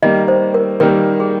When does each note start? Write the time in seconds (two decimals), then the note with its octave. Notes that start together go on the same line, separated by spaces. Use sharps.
0.02 D#3 G3 A#3 D#5
0.28 C5
0.54 A#4
0.80 D#3 G3 A#3 A#4
1.20 G#4